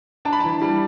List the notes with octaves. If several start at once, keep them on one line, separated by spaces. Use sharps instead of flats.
D4 A5
B5
E3 A5
G3